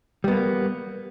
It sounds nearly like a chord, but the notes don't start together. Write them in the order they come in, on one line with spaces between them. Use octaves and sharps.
G3 B3 A#3